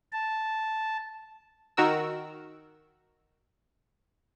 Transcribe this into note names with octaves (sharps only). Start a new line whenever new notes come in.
A5
D#3 F#4 A#4 E6